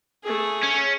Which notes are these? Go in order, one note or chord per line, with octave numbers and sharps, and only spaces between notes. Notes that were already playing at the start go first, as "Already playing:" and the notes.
A3 G#4
C#4